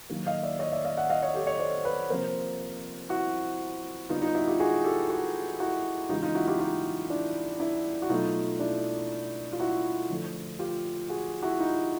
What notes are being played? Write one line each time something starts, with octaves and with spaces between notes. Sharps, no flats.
D#3 F#3 A#3
D#5 F5
D5 E5
C#5 D#5
D5 E5
D#5 F5
E5 F#5
D#5 F5
C#5 D#5
G4 A4
C#5 D#5
C5 D5
B4 C#5
C3 F3 A#3 A#4 C5
E4 F#4
D3 G3 B3 D#4 F4
D#4 F4
E4 F#4
F4 G4
F#4 G#4
G4 A4
F#4 G#4
E4 F#4
C#3 E3 G#3 D#4 F4
D#4 F4
E4 F#4
F4 G4
D#4 F4
D4 E4
D4 E4
F#4
B2 F#3 A3 D#4 F4
D4 E4
F4
E4 F#4
D3 F3 A3
F4 G4
F#4 G#4
E4 F#4
D#4 F4